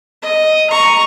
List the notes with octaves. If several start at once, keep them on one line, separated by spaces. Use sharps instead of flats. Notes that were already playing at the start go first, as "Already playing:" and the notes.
D#5
A#5 C#6